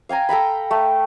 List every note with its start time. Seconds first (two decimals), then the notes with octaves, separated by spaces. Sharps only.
0.09 F5 G5 G#5 A#5
0.29 A4 G5 A#5 B5
0.71 A3